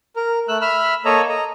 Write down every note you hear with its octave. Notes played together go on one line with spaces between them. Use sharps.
A#4
A3 E6 F#6
E5 B5 E6 F6
A#3 A4 C#5 D#5 A#5 E6
D#5 A#5